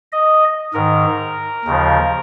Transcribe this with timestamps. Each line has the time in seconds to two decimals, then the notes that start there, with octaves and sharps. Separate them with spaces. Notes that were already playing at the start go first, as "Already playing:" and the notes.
0.13 D#5
0.74 G#2 D#3 A#4
1.65 D#2 C#3 F3